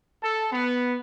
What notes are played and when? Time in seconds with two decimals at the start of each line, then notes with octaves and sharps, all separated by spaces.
0.22 A4
0.52 B3